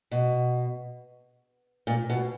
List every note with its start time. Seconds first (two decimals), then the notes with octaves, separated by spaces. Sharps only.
0.11 B2
1.87 A#2
2.10 B2